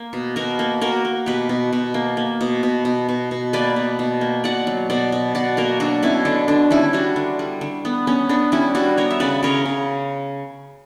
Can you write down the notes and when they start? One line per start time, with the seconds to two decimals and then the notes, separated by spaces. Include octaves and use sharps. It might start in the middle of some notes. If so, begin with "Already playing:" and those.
Already playing: A#3
0.13 B2
0.36 B2 F#4 A#4
0.59 A#3
0.81 A#3 F#4 A#4
1.05 A#3
1.26 B2 G4 B4
1.49 B2
1.73 B2
1.94 A#3
2.17 A#3
2.41 B2
2.63 B2
2.85 B2
3.09 B2
3.31 B2
3.53 A#3 B4 D5
3.76 B2
3.99 B2
4.21 A#3
4.44 B2 D5 F#5
4.67 F#3
4.90 B2 D5 F#5
5.12 B2
5.35 B2 D5 F#5
5.57 A#3 F#4 A#4
5.80 F#3 D4 F#4
6.02 B2 C#4 E4
6.25 D3 D4
6.48 D3 D4
6.71 G3 C#4 E4
6.93 G3 D4 F#4
7.16 D3
7.39 G3
7.61 D3
7.85 B3
8.07 B3 C#4
8.29 B3 D4
8.52 G3 C#4 E4
8.75 G3 D4 F#4
8.97 B3 A#4 C#5
9.11 E5
9.20 C#3 B4 D5
9.43 C#3 A#4 C#5
9.66 C#3